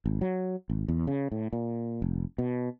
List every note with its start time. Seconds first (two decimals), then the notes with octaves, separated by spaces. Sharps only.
0.06 G#1
0.21 F#3
0.70 G#1
0.88 E2
1.07 C#3
1.32 A2
1.53 A#2
2.02 F1
2.38 B2